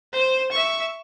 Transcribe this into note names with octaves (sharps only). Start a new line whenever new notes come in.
C5
E5 C#6